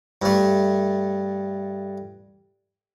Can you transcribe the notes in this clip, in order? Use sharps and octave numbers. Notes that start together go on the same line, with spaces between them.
G2 A3